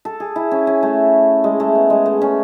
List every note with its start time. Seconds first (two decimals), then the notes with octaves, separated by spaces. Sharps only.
0.05 A4
0.20 G#4
0.36 E4
0.51 C#4
0.67 C#4
0.83 A3
1.44 G#3
1.60 A3
1.75 B3
1.90 G#3
2.06 A3
2.22 C#4